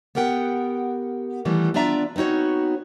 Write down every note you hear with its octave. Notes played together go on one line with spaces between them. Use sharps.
B3 G4 A#4 F#5 G5
D#3 E3 G3 A3 B3
B3 D4 F4 D5 E5 A#5
B3 C4 D#4 F#4 C#5